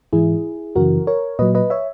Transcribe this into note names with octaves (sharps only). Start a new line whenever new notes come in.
G#2 E3 E4 G#4
F#2 C#3 E3 F#4 A#4
A#4 C#5
A#2 F#3 B4 D#5
B4 D#5
C#5 E5